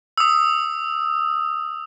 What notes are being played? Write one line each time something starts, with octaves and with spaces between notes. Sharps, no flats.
D#6 E6